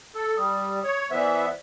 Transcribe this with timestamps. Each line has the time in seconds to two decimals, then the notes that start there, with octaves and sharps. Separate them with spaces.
0.15 A4
0.37 G3 D#6
0.84 C#5
1.11 E3 B3 C5 D5 E5